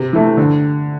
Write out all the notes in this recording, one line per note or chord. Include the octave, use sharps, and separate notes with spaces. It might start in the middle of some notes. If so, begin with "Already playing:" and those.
Already playing: C3
E3 A3
D3